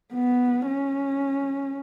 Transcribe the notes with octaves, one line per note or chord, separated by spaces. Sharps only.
B3
C#4